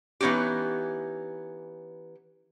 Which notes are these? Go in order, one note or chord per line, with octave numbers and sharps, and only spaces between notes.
E3 B3 C#4 D#4 G4